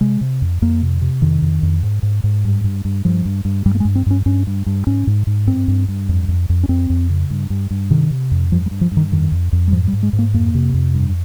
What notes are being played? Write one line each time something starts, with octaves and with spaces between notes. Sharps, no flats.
C3 G#3
C3
F2
F2 A#3
C3
C3
F2 D#3
F2
F2
G#2
G#2
G#2
G2
G2
G2
G2 F3
G2
G2
G2 G3
A#3
G#3
G2
C4
G2 C#4
G2 C#4
G2
G2
G#2 C#4
G#2
G#2
G2 C4
G2
G2
F2
F2
F2
C#4
F2 C4
F2
C#3
G2
G2
G2
C3 D#3
C3
F2
G2 F3
G3
G2
F3
G2
D#3
F2 D#3
F2
F2
G3
G#2 F3
G3
G#2
G#3
G#2
A#3
F2 A#3
C3
F2
G2